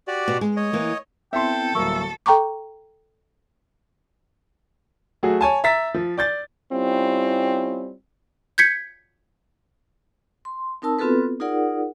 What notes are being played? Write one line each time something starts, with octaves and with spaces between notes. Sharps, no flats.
F#4 G4 D5
B2
G#3
C#5 D#5
E3 A#3
B3 C4 E4 A4 E5 G5 C6
D1 F#3 G3 A#3 E5 C#6
A4 G5 A#5 C#6 D6
F#3 A3 F#4 G#4
C#5 G#5 A5
E5 A#5 E6 A6 B6
F3
D5 G6 A6
G3 C4 C#4 E4 F4
G6 G#6 B6 C#7
C6
C4 D#4 A#4 A5 E6
B3 C4 F4 F#4 A4 B4
D#4 F4 G#4 A#4 D5 F#5